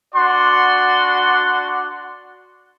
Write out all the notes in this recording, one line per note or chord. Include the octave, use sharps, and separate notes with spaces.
D4 F#4 D5 F#5 C6